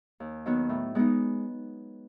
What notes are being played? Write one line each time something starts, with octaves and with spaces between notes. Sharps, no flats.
D#2
D#3 F#3 B3 F#4
A2
G#3 B3 D#4